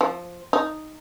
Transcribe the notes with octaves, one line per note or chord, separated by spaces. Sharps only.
F3
D#4